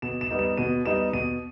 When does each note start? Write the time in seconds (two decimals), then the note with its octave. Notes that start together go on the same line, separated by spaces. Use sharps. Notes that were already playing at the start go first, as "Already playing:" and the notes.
0.02 B2 E7
0.21 E7
0.31 G3 B3 D#4
0.39 E7
0.57 B2 D#7
0.85 G3 B3 D#4 E7
1.13 B2 D#7